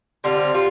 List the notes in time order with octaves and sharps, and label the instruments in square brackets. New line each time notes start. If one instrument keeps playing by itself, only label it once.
[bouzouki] D3 G3 C4 F4
G3 F4